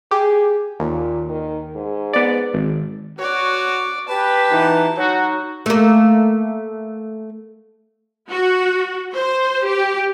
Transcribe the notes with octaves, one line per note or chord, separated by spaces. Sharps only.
G4 G#4
D#2 A#2
D#3
G#2
B3 D5
G#1
F#4 C#5 D5
G4 B4 A5
B2 E3 D#4
F#3 D#4 F#4
A3 A#3
F#4
C5
G4